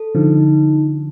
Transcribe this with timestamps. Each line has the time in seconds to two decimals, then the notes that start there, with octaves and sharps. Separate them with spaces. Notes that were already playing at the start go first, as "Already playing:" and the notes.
Already playing: A4
0.15 D3 F3 D#4
0.37 D#4